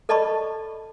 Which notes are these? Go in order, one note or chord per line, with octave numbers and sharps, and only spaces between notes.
A4 D5 D#5 A5 B5 C#6